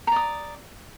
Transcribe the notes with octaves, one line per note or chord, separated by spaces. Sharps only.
D5 A#5 D#6